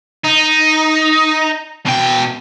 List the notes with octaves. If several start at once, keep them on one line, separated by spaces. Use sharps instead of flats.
D#4
B2 G5